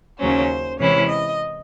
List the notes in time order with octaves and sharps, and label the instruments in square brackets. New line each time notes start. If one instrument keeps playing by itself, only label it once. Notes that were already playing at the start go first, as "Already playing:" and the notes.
[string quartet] D#2 C#3 F#3 C#4 C5
C3 E3 G#3 C#4 E4 C#5
D#5